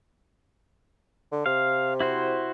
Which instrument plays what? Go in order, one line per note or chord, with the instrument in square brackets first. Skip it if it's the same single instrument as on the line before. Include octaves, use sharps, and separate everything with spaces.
[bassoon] D3
[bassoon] C3 [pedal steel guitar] F5
[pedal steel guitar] E4 F#4 C5